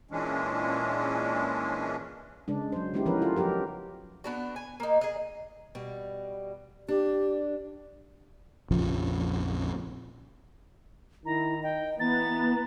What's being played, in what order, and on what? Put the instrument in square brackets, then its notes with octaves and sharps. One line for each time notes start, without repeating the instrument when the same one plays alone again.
[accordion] A#2 E3 G#3 C#4 D4
[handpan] C#3 G#3 D4
F#3 C5
G#3 B3 C#4 D#4 E4 G4
E3 F3 B3 C#4 A#4 B4
F4 A4
F3 F#3 G4 A#4
[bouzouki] B3 D4 F#4
G#5
A#3 D#4
G#4 D#5
[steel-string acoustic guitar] B2 G3
[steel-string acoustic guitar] D4 [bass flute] G4
[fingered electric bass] A#1 F2 C#3 F3
[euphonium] D#3 [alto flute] E4 [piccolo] A#5
[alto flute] D#5 [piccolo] G5
[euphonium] E3 [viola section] B3 [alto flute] A#5 [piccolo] A6